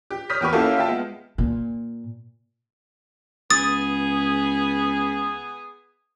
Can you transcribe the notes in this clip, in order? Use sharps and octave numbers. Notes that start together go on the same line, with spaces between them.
G4
C#5 D#6 F6 G6 B6
E2 G4 B4 C#6
A#3 C#4 E4 F#4 G4 A4
F4 E5 G5 A5
G#3 B3
A#2
C#2 B3 G#4 D#6 A6